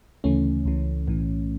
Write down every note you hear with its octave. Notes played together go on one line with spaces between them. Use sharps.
D2 C#3 E3 A3 C#4
C#2 C#3 E3
B1 A2 E3